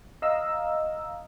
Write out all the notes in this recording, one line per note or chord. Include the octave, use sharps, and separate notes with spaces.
D#5 F5 A#5 E6